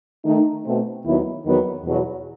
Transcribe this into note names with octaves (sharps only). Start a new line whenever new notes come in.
D#3 A3 D#4
B2 A3 C4
D#2 D#3 F#3 B3 E4
E2 D#3 F#3 B3
E2 B2 F#3